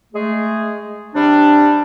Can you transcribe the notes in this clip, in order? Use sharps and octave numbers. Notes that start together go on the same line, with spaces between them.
G#3 A3 G#4
C3 G3 C4 D4